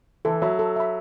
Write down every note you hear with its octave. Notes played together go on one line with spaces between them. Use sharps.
E3 A4
F#3 E5 B5
A4
E5 B5